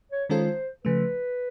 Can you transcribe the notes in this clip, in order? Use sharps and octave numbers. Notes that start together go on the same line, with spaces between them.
C#5
D#3 G#3 C#4 F4 A4 C5
C#3 F3 A3 B4